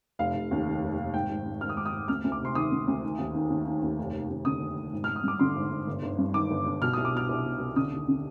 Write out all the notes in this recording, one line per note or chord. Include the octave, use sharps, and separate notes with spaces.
F1 F5
F1
D#2
D#3
F1
F1
G#1 G5
G#1
G#2
D#3 F6
D#6
G#1 D6
D#6
G#1
D2 F6
D2
D6
C3
C6
D#3 D#6
D2
D2
D#3
D#2
D#3
D#2
D#3
D#2
F1
F1
D#2
D3 D#6
F1
F1
G#1
G#1 F6
D#6
G2 D6
D3 C6
G#1
G#1
G1
G1
G2
D#3 D6
G1
G1
B2 F6
C2 D#6
D6
B2 F6
C2
B2
C2
D3 D#6
D#2
D3